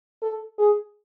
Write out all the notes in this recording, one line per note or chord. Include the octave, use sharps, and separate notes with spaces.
A4
G#4